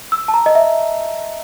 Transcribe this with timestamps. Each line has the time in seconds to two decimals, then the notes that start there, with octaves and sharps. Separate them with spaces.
0.12 E6
0.28 A5
0.34 A#5
0.46 D#5
0.55 E5